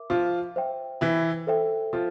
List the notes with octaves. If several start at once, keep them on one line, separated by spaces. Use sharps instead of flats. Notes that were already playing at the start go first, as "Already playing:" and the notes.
Already playing: A#4 E5 D6
F3 F4
C5 E5 G5
E3 E4
A4 C5 E5 G5
F3 F4